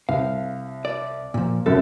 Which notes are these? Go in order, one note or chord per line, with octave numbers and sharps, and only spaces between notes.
C2 F5
D5
A#2 F3
C2 F#2 A4